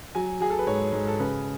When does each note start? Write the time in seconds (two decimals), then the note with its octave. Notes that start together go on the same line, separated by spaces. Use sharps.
0.15 F#3 G#5
0.41 F#3 G#4
0.50 A4
0.59 B4
0.67 G#2 C#5
0.92 G#2
1.07 A4
1.20 C#3 B4